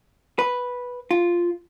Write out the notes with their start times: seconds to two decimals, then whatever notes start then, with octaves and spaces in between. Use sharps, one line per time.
0.39 B4
1.11 F4